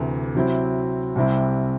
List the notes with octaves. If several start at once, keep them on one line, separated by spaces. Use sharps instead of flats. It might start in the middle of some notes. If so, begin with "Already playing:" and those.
Already playing: D2 C3 E3 A3
C3 F#3 C4 E4
C2 C3 G3 C4 E4